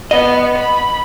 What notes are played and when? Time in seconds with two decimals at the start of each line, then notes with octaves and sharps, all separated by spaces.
0.11 B3 D#5
0.58 B5